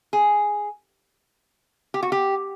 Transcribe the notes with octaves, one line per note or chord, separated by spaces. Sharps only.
G#4
G4
F#4
G4